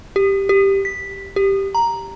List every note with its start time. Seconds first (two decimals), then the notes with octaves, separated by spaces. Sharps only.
0.16 G4
0.49 G4
0.85 B6
1.36 G4
1.75 A#5